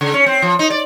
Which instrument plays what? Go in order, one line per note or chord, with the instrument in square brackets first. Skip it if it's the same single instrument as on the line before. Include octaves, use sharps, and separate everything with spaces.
[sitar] C#3
C#4
C4
F3
D#4
D5